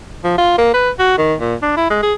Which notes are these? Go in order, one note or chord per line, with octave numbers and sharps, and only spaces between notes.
F3
F4
A#3
B4
F#4
D#3
A#2
D4
E4
G#3
G#4